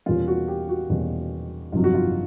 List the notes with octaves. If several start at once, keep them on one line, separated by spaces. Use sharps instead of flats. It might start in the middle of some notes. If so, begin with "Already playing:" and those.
E2 B2 G3 A#3 C#4 F4
F#4
G4
F#4
E2 B2 G3 A#3 C#4
G1 F2 C3 D#3 F#3 F4
F#4
F4